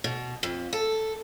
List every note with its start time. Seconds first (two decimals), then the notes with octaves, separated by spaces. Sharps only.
0.04 B2
0.43 F2
0.73 A4